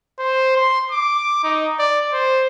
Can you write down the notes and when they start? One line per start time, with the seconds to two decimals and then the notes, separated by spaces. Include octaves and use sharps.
0.19 C5
0.56 C6
0.92 D6
1.44 D#4
1.79 D5
2.13 C5